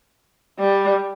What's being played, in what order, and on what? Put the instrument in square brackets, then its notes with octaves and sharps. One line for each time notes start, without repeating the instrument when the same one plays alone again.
[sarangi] G3